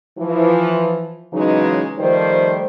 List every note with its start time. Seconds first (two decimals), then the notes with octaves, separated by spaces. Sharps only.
0.18 E3 F3
1.33 C#3 E3 F#3 G#3 D#4
1.99 D#3 F3 G3 A3 C5